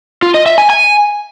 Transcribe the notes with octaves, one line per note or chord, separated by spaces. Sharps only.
F4
D#5
E5
G#5
G#5